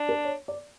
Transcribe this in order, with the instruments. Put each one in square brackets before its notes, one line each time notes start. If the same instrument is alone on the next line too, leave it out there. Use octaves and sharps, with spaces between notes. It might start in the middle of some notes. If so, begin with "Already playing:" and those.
Already playing: [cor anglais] D4
[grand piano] A#4
C#5
D5